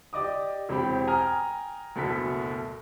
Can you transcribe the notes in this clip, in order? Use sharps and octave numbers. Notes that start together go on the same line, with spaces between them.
G4 D5 D#5 D6 D#6
E1 C4 G4 B5
G5 G#5 A#5 D#6 F6
F#1 D2 B2 A4 B6